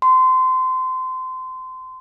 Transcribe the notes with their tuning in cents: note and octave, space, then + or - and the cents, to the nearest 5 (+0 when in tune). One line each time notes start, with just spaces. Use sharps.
C6 -25